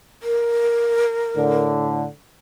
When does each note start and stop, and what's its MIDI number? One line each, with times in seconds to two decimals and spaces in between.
0.23 1.67 70
1.35 2.06 45
1.35 2.06 50